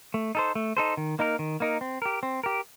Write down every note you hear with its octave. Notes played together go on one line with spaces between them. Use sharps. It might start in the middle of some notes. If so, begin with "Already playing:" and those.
A3
D#4 A4 C5
A3
D#4 A4 C5
D#3
A#3 D#4 A#4
D#3
A#3 D#4 A#4
C4
G4 A#4
C4
G4 A#4